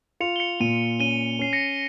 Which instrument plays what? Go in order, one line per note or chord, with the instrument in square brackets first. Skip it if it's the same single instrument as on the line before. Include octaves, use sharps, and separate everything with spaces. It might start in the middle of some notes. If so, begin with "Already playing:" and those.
[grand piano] F4 [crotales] C#7 F7
[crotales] G7
C#7 F7
[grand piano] A#2 [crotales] D#7 G7
[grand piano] C#4 [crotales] D#7 G7
[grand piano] C#4 [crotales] C7
[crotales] A#6 C#7